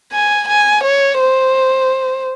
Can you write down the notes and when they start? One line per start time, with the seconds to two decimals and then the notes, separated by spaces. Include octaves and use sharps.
0.12 G#5
0.48 G#5
0.83 C#5
1.20 C5